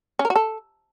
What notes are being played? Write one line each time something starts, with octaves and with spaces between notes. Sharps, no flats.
C#4
A#4
F#4
A4